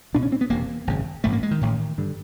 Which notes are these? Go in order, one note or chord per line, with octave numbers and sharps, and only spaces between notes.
C#2 B2 D4
C#4
C4
B3
E1 E2 C3 A#3
G#1 F#2 C#3
A1 G#2 A3
A#3
G#3
D#3
A1 A2
G2 D3